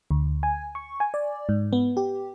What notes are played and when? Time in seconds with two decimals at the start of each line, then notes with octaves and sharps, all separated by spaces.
0.11 D2
0.43 G#5
0.75 C#6
1.00 G#5
1.14 D5
1.49 G#2
1.73 B3
1.97 G4